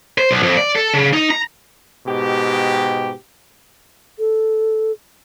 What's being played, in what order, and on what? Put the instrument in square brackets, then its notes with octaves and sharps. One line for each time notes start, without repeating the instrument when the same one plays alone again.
[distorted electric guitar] C5
B1
F2
D5
A4
C#3
D#4
A#5
[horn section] G#2 B2 G4
[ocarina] A4